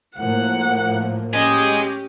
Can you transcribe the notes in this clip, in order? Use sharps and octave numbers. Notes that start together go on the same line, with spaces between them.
A2 F3 A#3 F#5
C#4 G4 G#4 D#5